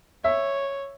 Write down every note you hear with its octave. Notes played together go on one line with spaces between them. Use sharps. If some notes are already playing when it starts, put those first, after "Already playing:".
C#5 E5